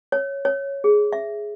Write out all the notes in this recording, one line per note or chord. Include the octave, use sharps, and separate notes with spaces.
C#5
C#5
G#4
E5